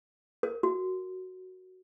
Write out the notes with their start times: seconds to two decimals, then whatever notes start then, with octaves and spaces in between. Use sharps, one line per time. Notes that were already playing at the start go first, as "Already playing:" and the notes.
0.43 A#4
0.63 F#4